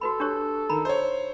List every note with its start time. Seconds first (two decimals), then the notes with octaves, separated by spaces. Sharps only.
0.01 F#4 A4 B4 B5
0.20 D4 G4 C#5
0.69 D#3 A#5 B5
0.85 C5 C#5